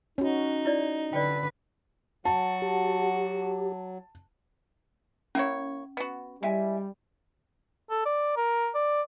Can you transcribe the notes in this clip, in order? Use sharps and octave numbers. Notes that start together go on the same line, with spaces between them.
C#4 D#4 F#4
E4 D5
D3 B4 D5 G5
F#3 F#4 A5
G4
A#3 C#4 E4 C#5
B3 F#4
G3 G#3 E4 E5 G#5
A4
D5
A#4
D5